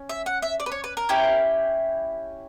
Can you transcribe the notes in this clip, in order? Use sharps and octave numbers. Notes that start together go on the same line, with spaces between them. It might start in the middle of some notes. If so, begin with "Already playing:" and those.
Already playing: C#4
E5
F#5
E5
D5
B4
C#5
B4
A#4
C#4 E4 G4